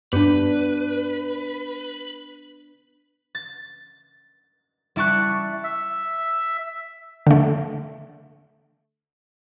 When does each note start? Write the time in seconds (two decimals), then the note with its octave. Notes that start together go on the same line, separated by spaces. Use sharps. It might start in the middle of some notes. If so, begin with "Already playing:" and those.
0.13 G2 B3 D4 B4
3.35 A6
4.96 G3 E4 A5 C#6 F#6
5.64 E5
7.27 D3 A3